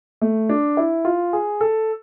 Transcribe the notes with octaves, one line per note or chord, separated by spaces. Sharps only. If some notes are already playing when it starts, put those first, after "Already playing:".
A3
D4
E4
F4
G#4
A4